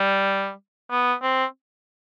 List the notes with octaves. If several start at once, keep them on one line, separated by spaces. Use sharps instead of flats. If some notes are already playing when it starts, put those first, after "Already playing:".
Already playing: G3
B3
C4